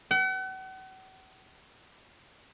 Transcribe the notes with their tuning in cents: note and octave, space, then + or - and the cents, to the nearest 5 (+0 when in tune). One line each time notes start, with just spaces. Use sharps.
F#5 +40